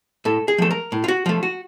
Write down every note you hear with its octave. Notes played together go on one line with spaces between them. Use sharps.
A2 A4
G#4
F3 A3 A4
A#4
A2
F4
F#4
F3 A3 F4
F#4